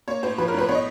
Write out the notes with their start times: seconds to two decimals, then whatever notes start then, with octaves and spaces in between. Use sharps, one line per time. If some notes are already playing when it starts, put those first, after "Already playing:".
0.08 A#3 C#5
0.23 A2 C5
0.38 F3 B4
0.48 A#4
0.54 A2 B4
0.69 B3 C#5
0.75 D#5